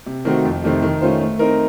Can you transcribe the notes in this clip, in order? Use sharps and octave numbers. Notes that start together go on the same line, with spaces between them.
C3
D#3 A3 C4 F#4
F2
C3 D#3 A3 C4
D#3
A3 C#4 F4 C5
A3
C4 D#4 A#4